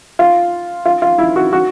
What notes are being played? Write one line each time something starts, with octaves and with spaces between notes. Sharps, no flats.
F4
F4
F4
E4
F#4
F#4